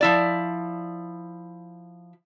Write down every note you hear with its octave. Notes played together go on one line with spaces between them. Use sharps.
F3 E4 D5